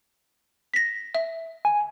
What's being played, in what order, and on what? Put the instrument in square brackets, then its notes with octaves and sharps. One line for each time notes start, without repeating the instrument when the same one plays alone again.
[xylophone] A#6 B6
E5
[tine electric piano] G#5